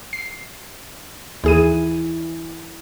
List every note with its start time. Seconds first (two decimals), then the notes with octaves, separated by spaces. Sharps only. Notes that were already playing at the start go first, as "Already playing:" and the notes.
0.13 C7
1.44 D#2 E3 G#4 D#7